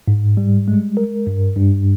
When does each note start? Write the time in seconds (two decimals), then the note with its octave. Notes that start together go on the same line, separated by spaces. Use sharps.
0.08 G#2
0.37 G3
0.68 G#3
0.97 A#4
1.27 G2
1.57 G2